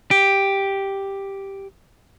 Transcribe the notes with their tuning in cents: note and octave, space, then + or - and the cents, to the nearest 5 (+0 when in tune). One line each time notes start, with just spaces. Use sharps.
G4 +0